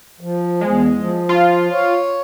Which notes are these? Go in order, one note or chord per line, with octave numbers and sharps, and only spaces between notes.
F3
E2 G#3
F3
F4
C#5